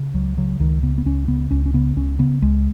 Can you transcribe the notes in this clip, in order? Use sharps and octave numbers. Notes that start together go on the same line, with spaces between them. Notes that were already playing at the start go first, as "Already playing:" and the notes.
Already playing: C#3
C#2 F#3
C#3 F#3
C#2 D#3
C#3 B3
B3
C#2 C#4
C#3 B3
C#2 C#4
C#4
C#3 B3
C#2 C#4
C#3 B3
C#2 G#3